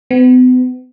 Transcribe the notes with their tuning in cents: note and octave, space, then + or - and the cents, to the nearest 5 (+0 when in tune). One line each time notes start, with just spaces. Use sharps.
B3 +40